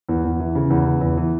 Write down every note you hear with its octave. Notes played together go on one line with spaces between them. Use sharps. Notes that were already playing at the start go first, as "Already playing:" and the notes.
E2
E2
E3
C#3
E2
C#3
E2
E3